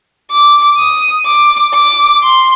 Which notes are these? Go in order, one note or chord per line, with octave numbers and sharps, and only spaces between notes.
D6
D#6
D6
D6
C6